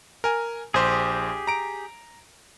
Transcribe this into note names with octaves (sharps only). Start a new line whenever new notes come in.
A#4 G#5
A#1 G4 G#4 C5
A#5 D7